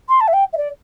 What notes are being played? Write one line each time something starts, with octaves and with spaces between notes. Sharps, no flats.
C6
A5
E5
G5
E5
D5